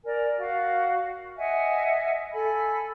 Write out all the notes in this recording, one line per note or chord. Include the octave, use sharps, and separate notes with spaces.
A#4 D5 G#5
F#4 F5
D#5 E5 F#5 G#5
A4 G#5 B5